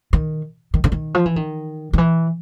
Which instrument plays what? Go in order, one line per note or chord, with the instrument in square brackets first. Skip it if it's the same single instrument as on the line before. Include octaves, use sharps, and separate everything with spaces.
[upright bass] D#3
D#3
D3
D#3
F3
E3
D#3
D#3
E3